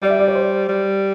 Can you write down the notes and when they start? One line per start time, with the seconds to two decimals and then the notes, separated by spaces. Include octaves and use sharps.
0.02 G3 D5
0.10 E5
0.19 D5
0.28 C#5
0.35 C5
0.69 G3